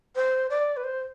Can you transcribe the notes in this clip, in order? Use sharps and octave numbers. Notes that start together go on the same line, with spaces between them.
C5
D5
B4
C5